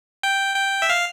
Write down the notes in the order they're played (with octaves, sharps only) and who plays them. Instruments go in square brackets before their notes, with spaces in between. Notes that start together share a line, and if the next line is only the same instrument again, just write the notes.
[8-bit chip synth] G5
G5
E5
F5